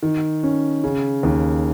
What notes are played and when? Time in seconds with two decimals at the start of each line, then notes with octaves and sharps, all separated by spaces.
0.03 D#3
0.43 C#4
0.84 C#3
1.23 D#2